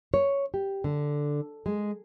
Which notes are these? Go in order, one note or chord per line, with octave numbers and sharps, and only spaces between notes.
C#5
G4
D3
G#3